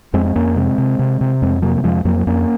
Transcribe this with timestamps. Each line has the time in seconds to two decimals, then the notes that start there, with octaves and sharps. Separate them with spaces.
0.13 F2 G#3 C4
0.25 C4
0.36 F2 A#3 C#4
0.56 C3 G#3 C4
0.78 C3
0.99 C3
1.21 C3
1.42 F2 G#3 C4
1.62 C3 F#3 A#3
1.77 F#3
1.84 F2 F3 G#3
2.05 F2 F#3 A#3
2.27 F2 A#3 C#4